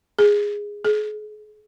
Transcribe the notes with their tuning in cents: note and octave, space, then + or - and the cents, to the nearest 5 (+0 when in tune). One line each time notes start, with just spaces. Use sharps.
G#4 -10
G#4 +40